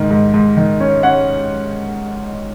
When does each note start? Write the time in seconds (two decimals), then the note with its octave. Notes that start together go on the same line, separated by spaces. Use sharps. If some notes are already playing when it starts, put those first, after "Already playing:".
Already playing: G#2 D#3
0.10 G#2
0.34 G#2
0.57 D#3
0.80 C#4
1.03 C#4 F#5